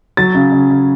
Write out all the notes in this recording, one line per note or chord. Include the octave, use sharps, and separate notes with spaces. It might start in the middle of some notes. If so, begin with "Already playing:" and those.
F#3 A6
C#3
C#3
C#3